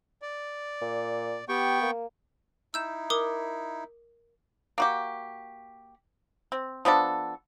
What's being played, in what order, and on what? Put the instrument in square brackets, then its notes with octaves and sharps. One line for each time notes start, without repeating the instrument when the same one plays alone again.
[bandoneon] D5
[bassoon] A#2
[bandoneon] B3 G5 C#6 [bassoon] G4
[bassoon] A#3
[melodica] D#4 E4 [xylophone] E6 G6 E7
[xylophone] A#4 D6 D#6
[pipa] A#3 F#4 G4
C4
F3 B3 D4 A4